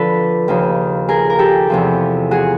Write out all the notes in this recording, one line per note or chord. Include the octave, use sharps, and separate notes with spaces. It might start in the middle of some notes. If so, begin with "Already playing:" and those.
Already playing: D3 F3 A4 B4
D#2 C#3 F3
G#4 A#4
A#4
G4 A4
E2 C3 F3
F#4 G#4